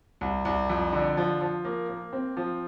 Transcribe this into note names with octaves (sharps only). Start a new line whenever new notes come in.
C2
C2
F2
D3
F3
F3
A#3
A#3
C4
F3